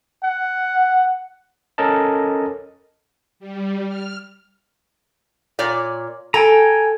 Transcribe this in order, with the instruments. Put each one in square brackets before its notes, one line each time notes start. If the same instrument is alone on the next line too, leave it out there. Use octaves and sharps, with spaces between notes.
[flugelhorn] F#5
[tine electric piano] C#4 A4 A#4 D#5 A5
[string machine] G3
F6
[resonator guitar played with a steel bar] A#2 C#5 D5
[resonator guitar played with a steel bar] A4 [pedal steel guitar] G5 G#5 A#5